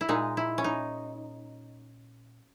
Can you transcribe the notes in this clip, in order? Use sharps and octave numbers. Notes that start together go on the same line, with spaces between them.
E4
A#2 G#3 D#4
E4
C#4
D#4